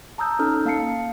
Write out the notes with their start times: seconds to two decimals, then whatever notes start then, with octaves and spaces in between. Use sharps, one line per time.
0.18 A5 A#5 D#6 E6 G6
0.39 C#4 D#4 A4 F6
0.65 A#3 F5 A5 C7 C#7